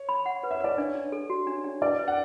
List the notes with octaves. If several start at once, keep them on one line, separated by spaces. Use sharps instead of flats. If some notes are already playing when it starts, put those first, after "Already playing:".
Already playing: C#5
B5
F#5
B4
E5
B4 D5
D4 C#5
D4
A4
F#4
D4
D4
B4 D5
B4
F#5